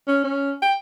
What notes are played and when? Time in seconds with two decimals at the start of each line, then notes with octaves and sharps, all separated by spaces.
0.08 C#4
0.24 C#4
0.62 G5